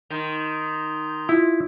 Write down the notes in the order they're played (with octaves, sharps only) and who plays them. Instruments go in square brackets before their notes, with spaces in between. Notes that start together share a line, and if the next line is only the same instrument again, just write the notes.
[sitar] D#3 [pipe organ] A#5 C6 G6
[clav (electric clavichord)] E4 [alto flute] F4